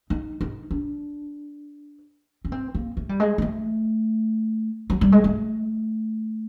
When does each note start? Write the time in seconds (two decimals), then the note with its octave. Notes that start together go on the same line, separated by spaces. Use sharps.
0.10 D#4
0.41 D#4
0.71 D4
2.45 C#4
2.52 C4
2.75 A#3
2.97 A3
3.09 G3
3.20 G#3
3.38 G#3
3.42 A3
4.90 F#3
5.01 G3
5.12 G#3
5.24 A3